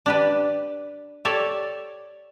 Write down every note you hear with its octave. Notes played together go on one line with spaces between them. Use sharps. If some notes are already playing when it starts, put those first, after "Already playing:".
D4 G4 B4
G4 A4 C#5 D5